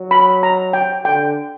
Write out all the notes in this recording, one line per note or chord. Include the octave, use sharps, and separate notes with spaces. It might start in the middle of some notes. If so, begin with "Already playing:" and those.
Already playing: F#3
B5
A#5
G5
D3 G5